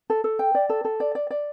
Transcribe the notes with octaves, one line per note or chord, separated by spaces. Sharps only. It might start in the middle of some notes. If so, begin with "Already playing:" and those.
A4
A4
G5
D5
A4
A4
D5
D5
D5